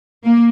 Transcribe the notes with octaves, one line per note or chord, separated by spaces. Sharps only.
A#3